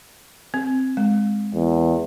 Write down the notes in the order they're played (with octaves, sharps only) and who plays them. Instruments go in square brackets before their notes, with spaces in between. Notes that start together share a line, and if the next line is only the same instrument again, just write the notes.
[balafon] C4
G#3
[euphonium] E2